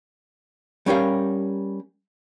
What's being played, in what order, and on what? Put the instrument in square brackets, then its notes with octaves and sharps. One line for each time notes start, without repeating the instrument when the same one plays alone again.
[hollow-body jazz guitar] G3 C#4 G4 A#4 F5